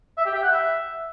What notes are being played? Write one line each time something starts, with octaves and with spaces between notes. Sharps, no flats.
E5
G4
G5
F#5
E5